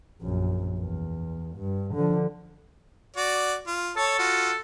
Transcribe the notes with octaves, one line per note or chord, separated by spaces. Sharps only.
A#1 F#2
E2
G2
D3 F3
F#4 D5
F4
A4 C#5 A5
F4 F#4